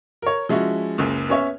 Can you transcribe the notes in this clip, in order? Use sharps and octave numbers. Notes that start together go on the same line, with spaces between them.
A#4 C#5
F3 G#3 C#4 E4 F#4
F#1 C#2
B3 C#4 C#5 E5